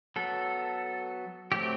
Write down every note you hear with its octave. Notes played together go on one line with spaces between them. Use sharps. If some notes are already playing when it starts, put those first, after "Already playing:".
F#3 B3 A4
F#3 A3 C4 G4